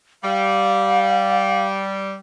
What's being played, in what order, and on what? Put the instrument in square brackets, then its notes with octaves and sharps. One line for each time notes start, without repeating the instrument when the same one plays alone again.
[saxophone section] G3 [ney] F5